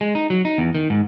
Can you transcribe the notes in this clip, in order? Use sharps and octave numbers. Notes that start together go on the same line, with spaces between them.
G#3
D#4
F#3
D#4
E2
D#3
G#2